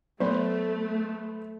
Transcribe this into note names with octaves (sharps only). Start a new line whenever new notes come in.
F#3 A3 B3 C5